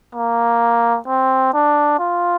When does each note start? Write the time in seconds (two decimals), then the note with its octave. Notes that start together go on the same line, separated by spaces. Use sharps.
0.15 A#3
1.07 C4
1.53 D4
1.99 F4